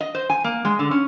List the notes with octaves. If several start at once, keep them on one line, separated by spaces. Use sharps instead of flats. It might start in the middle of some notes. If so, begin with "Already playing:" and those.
D#5
C5
G#5
A#3
G#3
D3
C#4